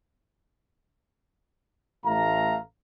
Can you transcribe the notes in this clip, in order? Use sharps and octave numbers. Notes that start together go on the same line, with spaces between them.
A1 A3 F5 A#5